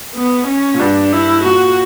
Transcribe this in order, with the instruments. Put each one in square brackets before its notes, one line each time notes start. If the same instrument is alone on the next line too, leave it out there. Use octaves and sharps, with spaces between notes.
[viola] B3
C#4
[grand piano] A#2
[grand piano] G2 [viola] D4
[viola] E4
[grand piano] A#2 [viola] F#4